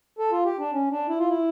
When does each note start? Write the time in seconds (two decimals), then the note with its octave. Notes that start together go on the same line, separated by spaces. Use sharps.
0.19 A4
0.32 F4
0.45 G4
0.59 D4
0.73 C#4
0.91 D4
1.08 E4
1.19 F4
1.29 E4